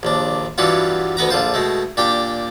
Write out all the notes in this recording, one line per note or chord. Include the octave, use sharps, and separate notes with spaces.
A#1 D#2 D4
G2 E3 F#3 G3 B3 F4
D2 B3 B4 A#5
A#1 D3 F4 C5
B2 G#3 A3
A#2 D4 G4 G5